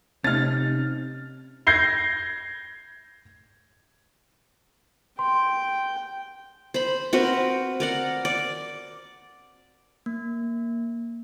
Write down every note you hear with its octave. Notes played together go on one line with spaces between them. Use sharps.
C3 C#4 D#4 F6 A6
G6 G#6 A#6 C7 G7
G5 C6
C5 B5
C4 F#4 A#4 B4
A#4 D5 F#5
D5
A#3